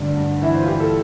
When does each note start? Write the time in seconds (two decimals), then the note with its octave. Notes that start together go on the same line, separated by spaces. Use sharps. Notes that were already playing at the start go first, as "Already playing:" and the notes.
Already playing: D2 G2 D5
0.17 G2
0.42 E3 E5
0.55 C5
0.62 F4
0.67 E3 G4
0.80 A4